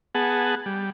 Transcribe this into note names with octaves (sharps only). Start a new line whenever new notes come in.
B3 G#4 F#5 A5
G3